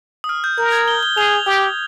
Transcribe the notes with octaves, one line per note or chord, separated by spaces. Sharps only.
D#6
F6
G6
A#4 G6
G#6
G7
G7
G#4 F7
G4